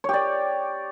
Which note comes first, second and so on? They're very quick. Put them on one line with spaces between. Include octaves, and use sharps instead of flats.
C#5 G4 D5